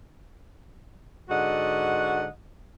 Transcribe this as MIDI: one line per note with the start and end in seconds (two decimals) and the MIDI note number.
1.29 2.27 44
1.29 2.27 50
1.29 2.27 66
1.29 2.27 75
1.29 2.27 78